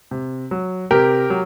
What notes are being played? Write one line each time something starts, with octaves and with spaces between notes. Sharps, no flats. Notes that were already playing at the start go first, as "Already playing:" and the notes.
C3
F#3
C3 G4 A#4
F#3